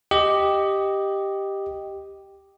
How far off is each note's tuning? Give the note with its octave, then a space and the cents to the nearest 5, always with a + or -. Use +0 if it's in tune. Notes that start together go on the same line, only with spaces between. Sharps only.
G4 +0 D#5 +0